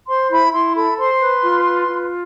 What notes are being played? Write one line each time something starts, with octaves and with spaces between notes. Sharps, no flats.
C5 C6
E4 B5
E4 C6
A4 B5
C5 C6
B4
F4
B4
F4